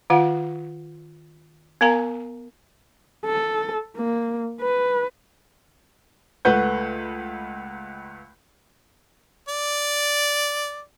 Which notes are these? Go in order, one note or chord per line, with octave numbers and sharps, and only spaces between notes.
D#3 F4 F5 F#5
B3 A#4 F5 G#5 A#5
A4
A#3
B4
C#2 A3 B4 F#5 G6
D5